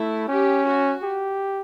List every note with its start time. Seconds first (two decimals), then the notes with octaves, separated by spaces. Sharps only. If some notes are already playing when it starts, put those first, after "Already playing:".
Already playing: A3 E4
0.28 C#4 G4
0.65 F#4
1.03 G4